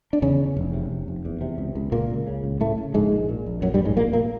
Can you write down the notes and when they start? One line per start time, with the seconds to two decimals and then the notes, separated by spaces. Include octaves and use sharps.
0.13 D4
0.22 E2 C#3 C#4
0.39 E2
0.57 F1
0.74 C3
0.91 F1
1.08 F1
1.25 E2
1.41 C3
1.58 C#2
1.75 C#2
1.92 C#2 A#2 A#3
2.10 C#2
2.27 C#3
2.44 C#2
2.60 A2 C#3 A3
2.78 C#3
2.94 A#1 G#2 G#3
3.12 A#2
3.29 A#2
3.46 A#1
3.62 F#2 A#2 F#3
3.74 G2 G3
3.79 A#1
3.85 G#2 G#3
3.96 A#1 A#2 A#3
4.13 A#2 A#3